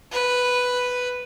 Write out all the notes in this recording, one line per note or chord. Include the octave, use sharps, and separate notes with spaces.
B4